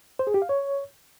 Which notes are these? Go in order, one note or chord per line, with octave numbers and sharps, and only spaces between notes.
C5
G#4
G4
F5
C#5